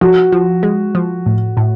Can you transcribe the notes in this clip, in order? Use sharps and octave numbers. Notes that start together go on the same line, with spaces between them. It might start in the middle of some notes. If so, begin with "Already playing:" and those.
F3 F#4
F3
G#3
F3
A2
A2